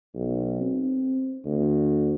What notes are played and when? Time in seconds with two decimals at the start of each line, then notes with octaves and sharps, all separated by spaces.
0.14 B1
0.61 C4
1.45 D2